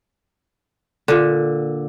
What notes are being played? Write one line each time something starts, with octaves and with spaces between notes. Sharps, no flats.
A#2 D3